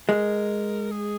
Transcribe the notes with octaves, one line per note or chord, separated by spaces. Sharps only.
G#3 A#4
G#4